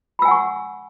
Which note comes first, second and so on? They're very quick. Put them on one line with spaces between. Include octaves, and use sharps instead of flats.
B5 E6 G#5 F#5 C#6